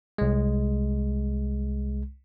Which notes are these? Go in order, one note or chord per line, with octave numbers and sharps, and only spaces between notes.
C2 G#3